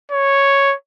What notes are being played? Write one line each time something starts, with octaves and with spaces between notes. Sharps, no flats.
C#5